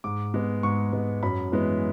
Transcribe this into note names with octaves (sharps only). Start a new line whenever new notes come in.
G#2 D6
G#3 B3
G#2 C#6
G#3 B3
F#2 B5
E3 G#3 B3